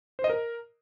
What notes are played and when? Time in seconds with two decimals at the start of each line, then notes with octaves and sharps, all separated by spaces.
0.19 C5
0.24 D#5
0.30 A#4